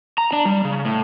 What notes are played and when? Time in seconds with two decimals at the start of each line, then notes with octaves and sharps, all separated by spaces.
0.18 A#5
0.33 D4
0.45 G3
0.65 C#3
0.85 A2